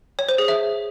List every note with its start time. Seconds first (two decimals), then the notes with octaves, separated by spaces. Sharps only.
0.19 C#5
0.29 C5
0.38 G#4
0.48 E5